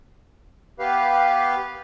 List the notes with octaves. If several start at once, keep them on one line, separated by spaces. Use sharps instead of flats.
B3 G4 B4 F5